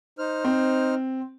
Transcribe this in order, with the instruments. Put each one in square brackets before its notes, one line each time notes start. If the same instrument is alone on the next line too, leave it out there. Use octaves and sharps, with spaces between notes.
[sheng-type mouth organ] D#4 C5 F6
[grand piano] C4